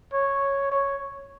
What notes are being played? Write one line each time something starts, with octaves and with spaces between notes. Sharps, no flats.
C#5
C#5